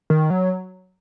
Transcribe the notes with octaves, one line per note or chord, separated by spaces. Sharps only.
D#3
F#3